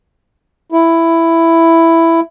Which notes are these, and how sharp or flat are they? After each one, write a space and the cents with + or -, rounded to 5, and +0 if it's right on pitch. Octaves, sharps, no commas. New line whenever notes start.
E4 +5